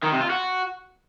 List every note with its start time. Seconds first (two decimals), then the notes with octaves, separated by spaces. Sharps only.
0.03 D#3
0.12 C3
0.21 F4
0.30 F#4